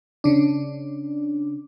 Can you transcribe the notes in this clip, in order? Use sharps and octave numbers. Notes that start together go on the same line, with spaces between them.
C#3 D4